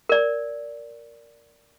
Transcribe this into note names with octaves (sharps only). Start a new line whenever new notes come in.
A#4 D5